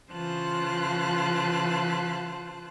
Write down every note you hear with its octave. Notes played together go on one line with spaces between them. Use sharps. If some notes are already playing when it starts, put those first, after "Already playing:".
C#3 E3 F4 C5 A5 F#6